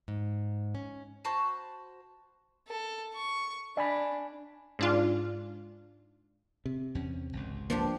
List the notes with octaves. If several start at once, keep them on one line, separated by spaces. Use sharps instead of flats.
G#2
C#4
F#4 C5 A5 B5
A4
C#6
D4 D5 G#5 B5
G#2 D4 F4
C3
E2 C#4
G#1 C#2
F3 A#3 D4 G4